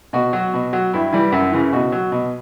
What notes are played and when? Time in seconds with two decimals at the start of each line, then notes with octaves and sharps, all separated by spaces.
0.13 B2 F#4
0.33 F#3
0.54 B2
0.73 F#3
0.94 G2 E4
1.13 E3 G3
1.32 F#2
1.52 C#3 E3
1.73 B2 F#4
1.92 F#3
2.12 B2